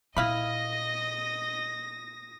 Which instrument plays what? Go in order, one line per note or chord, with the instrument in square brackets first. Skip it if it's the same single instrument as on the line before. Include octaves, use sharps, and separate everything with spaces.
[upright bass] A#2 [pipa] E4 F5 B5 [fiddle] D#5 [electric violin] D#6 A#6